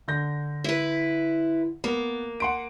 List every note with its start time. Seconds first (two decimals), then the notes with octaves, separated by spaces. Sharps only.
0.08 D3 G6 A#6
0.64 E4 B4
1.84 A#3 B3
2.40 F#5 C6 D7